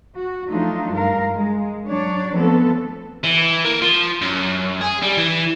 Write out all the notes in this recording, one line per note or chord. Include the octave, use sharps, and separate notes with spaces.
F#4
F3 F#3 A3 D4 D#4 F4
G2 G#3 A#4 F5
G#3
F#3 D4 C#5 D5
F3 A3 B3 C4 A4
E3
A#3
F3
F#2
G#4
G3
E3